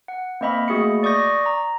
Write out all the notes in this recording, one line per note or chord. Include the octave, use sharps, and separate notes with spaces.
F#5
A#3 C4 D#5 E5 B5
A3 A#3 F#4 G#4 D#5 C#7
D5 C#6 D#6 G6 A#6
A#5